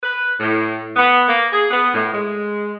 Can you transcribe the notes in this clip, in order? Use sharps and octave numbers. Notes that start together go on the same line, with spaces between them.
B4
A2
B3
A#3
G#4
B3
A2
G#3